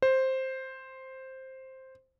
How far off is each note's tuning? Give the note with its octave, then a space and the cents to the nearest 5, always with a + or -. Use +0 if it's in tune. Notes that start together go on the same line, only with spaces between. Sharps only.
C5 +5